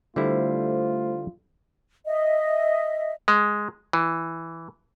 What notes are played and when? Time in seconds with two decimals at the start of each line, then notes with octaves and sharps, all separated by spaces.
0.16 D3 G3 A3 E4 F4 C5
2.06 D#5 E5
3.28 G#3
3.93 E3